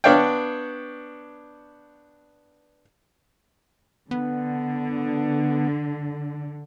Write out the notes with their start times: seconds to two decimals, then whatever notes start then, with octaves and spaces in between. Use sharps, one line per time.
0.04 B3 D4 C#5 F5 G5
4.11 D3 B3